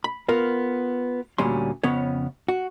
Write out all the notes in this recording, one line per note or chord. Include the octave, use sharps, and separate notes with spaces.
B5
B3 F4 A#4
D2 A#2 G3 C#4 C6
F2 C#3 B3 C#4 C#5
F#4